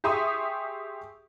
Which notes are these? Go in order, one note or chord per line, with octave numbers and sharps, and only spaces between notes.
G4 G#4 E5 C6 C#6 D#6